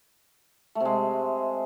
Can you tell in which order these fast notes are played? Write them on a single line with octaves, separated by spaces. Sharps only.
A3 C3 G#3